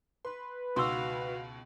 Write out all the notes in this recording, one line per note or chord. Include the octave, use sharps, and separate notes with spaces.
B4 C6
C#2 B2 D#3 F#4 F5 C6 C#6 E6